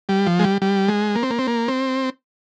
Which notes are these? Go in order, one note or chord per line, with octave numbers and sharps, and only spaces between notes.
G3
F3
G#3
G3
G3
G#3
A#3
C4
A#3
C4
A#3
C4